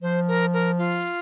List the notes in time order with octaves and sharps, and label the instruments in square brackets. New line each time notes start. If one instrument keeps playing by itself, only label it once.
[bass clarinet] F3 [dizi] C5
[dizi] A#4
A#4
F4